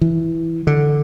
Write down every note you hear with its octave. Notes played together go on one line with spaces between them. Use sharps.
E3
D3